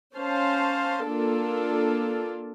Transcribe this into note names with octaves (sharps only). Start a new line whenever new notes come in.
C#4 C5 F5 A5
A#3 D4 F4 A4